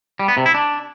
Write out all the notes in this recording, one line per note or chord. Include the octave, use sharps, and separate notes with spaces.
G3
B3
C3
E4
D4